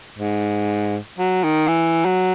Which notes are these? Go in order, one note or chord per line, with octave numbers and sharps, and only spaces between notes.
G#2
F#3
D#3
E3
F#3